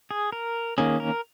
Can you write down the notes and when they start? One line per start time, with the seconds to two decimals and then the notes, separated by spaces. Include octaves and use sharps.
0.11 G#4
0.32 A#4
0.78 D#3 A#3 C#4 G#4
1.00 A#4